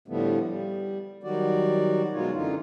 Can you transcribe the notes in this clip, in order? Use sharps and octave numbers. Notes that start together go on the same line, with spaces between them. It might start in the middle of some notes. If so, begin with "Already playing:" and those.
A2 D3 F3 G3 A3 B3
G3
D#3 F#3 G3 F#4 D5
B2 F#3 G#3 D#4 F4 C#5
F#2 D3 E3 D#4 F4